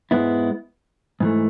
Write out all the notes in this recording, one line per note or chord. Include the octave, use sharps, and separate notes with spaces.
G#2 G#3 B3 E4
G#2 E3 A3